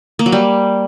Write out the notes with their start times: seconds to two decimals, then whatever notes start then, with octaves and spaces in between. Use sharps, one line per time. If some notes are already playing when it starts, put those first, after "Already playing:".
0.19 A#3
0.26 F#3
0.32 G3